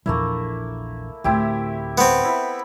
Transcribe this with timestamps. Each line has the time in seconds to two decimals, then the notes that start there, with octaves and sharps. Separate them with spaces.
0.06 A#1 E2 A3 A#3 E4
1.24 D2 A2 C4 E4 G4
1.98 B3 C4
2.25 E4 B5